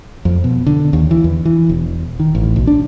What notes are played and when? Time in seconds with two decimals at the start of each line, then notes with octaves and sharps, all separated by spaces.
0.25 F2
0.44 B2
0.66 D3
0.93 D#2
1.11 E3
1.24 E2
1.45 E3
1.69 E1
2.20 D#3
2.35 A1
2.56 B1
2.67 D4